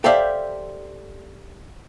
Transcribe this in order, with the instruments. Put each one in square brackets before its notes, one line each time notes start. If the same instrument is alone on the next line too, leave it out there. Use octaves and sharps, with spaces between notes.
[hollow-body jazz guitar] G4 A4 C5 D5 E5 F5